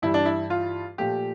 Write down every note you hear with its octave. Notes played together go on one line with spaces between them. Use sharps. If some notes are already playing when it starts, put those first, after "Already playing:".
G2 E3 G3 E4
D4
E4
F4
A#2 F3 A3 G4